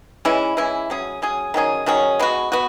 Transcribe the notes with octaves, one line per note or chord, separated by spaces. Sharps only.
E3 G#3 C#4 E4
E3 G#3 C#4 E4
F#3 C#4 G#4
F#3 C#4 G#4
D#3 F#3 C#4 G#4
D#3 F#3 C#4 G#4
G#3 B3 F#4
B3 F#4